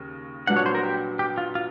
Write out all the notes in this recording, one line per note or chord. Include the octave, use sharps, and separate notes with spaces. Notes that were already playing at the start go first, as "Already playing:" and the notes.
Already playing: D#2 C#3
C2 A#2 F#3 B3 D4 F#5
C#5
C5
A#4
G4
G4
F4
F4